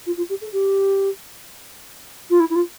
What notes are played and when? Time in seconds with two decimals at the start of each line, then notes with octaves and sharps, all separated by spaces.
0.06 F4
0.17 F4
0.29 G4
0.41 A4
0.53 G4
2.30 F4
2.40 E4
2.50 E4
2.55 F4